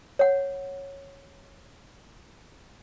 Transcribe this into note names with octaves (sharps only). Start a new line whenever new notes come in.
C#5 F#5